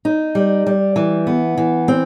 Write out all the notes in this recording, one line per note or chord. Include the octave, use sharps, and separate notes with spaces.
D#4
G3
G3
E3
B3
E3
C4